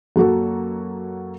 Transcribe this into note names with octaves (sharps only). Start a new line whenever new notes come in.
F#2 F#3 A#3 F#4 A4